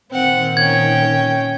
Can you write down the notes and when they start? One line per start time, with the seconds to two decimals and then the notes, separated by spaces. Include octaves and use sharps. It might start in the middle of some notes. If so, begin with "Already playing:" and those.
0.11 A#2 D#3 C4 F#5
0.57 C#4 G5 G#6